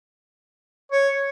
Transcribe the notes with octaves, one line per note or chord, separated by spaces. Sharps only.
C#5